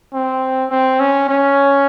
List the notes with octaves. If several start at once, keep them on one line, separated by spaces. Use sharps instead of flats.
C4
C4
C#4
C#4